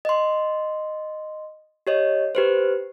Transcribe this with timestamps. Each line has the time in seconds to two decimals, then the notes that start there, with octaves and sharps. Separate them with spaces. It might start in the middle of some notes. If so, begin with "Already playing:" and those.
0.05 D#5 C6
1.87 G4 C#5 D#5
2.35 G4 B4 C5